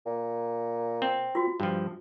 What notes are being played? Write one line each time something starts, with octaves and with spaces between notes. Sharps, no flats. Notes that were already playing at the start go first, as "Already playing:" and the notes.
A#2
C4
F4 F#4
G2 F3